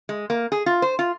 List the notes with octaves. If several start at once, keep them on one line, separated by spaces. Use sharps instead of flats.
G#3
A#3
G#4
F4
C5
F4